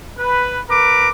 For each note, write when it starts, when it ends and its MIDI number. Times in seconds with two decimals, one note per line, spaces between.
0.18 0.59 71
0.69 1.08 70
0.69 1.08 71
0.69 1.08 86